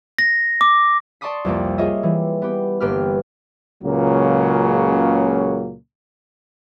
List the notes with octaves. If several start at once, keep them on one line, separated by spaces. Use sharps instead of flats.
A#6
D6
D5 A5 C6 C#6 D#6 B6
C2 F2 A#3
F4 G#4 C#5 D#5 E5
E3 G3
B3 G4
G1 A#3 G4 B4 F6
C#2 A#2 C#3 F#3 A#3